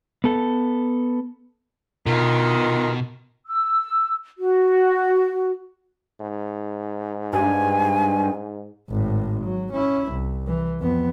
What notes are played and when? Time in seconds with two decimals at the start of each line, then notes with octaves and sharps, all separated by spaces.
0.24 B3 A4
2.06 D2 B2 D#3 F4
3.47 E6
4.38 F#4
6.20 G#2
7.33 G2 G#5
8.90 G#1 A2
9.44 F#3
9.72 C#4 E4
10.12 C2
10.47 E3
10.80 F2 B3